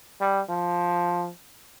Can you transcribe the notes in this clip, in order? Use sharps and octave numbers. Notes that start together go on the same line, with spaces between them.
G3
F3